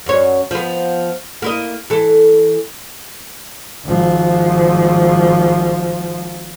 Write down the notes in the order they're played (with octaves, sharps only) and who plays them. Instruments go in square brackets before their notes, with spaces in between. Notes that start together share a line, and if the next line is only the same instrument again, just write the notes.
[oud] F#2 C#5
F3 B3
A#3 E4 D#5
E3 A4
[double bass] G#1 F3